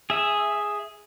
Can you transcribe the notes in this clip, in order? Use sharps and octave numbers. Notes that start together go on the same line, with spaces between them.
G#4 E5